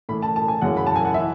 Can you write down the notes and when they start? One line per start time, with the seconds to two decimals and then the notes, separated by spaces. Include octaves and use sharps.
0.09 A2 E3 B5
0.22 A5
0.36 A5
0.48 G#5
0.61 F#2 C#3 E3 F#5
0.77 B5
0.87 A5
0.96 G#5
1.05 F#5
1.14 E3 E5